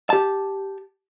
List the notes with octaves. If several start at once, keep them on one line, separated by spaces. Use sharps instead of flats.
G4 A5